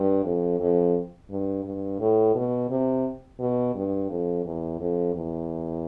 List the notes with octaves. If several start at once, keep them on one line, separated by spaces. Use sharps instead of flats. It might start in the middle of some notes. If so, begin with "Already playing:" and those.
Already playing: G2
F2
F2
G2
G2
A2
B2
C3
B2
G2
F2
E2
F2
E2